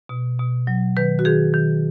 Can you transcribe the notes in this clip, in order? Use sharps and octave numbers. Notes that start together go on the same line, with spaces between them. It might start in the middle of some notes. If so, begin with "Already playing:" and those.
B2
B2
F#3
D#3 B4
F#4
D#3 G#4
D#3